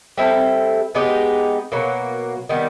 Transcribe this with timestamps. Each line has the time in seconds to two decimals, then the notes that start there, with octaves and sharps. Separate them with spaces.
0.17 G3 C4 E4 A4
0.95 G#3 B3 D#4 G4
1.72 B2 F#3 A#3
2.49 D#3 G3 B3